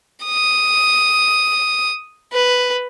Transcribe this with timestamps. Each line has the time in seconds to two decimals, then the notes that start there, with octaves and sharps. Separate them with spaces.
0.24 D#6
2.32 B4